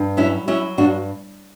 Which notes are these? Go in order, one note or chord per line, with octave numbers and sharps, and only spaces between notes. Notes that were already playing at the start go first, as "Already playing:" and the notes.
Already playing: G2
F#3 C#4 E4
F#3 C#4 E4
G2 D4 F#4